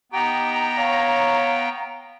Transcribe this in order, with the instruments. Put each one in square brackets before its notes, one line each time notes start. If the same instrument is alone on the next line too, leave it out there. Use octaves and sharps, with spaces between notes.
[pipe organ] B3 G5 [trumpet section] D#4 G4 [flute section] A#5
[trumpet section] C#5 [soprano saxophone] F5